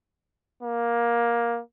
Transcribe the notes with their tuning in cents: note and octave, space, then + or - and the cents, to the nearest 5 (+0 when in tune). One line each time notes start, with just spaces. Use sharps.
A#3 +15